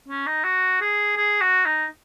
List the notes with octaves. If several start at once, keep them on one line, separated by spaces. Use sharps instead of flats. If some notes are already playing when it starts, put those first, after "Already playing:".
C#4
D#4
F#4
G#4
G#4
F#4
D#4